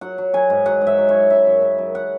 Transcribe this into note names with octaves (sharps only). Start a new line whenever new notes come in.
F#3 F#5
F#3
F#3 G#5
G#2
F#3 F#5
G#2
E5
F#3
C#5
F#3
C#3 E5
F#2
C#3
F#2
F#5